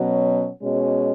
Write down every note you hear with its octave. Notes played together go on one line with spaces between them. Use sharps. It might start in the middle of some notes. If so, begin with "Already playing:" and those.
Already playing: B2 F#3 C#4
B2 G#3 C#4